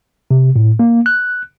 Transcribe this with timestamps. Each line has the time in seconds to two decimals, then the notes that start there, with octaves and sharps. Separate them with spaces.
0.31 C3
0.56 A2
0.79 A#3
1.06 F#6